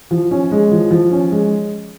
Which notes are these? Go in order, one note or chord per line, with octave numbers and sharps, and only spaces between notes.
F3
C#4
G#3
F3
F3
C#4
G#3